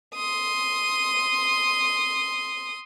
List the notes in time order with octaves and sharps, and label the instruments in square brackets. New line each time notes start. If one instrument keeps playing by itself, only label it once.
[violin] C6 D#6